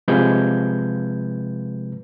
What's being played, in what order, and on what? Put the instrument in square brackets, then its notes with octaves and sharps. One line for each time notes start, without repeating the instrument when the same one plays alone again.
[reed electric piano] C3 F3 G#3 B4 G6 G#6